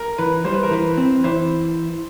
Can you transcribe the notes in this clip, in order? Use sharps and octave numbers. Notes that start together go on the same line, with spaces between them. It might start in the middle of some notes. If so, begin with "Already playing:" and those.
Already playing: A#4
E3 B4
G3 C5
B4
A#4
E3 B4
C4
E3 C5